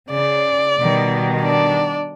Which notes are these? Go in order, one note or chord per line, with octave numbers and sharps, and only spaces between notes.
C#3 D5
B2 D#3 G3
D4 D5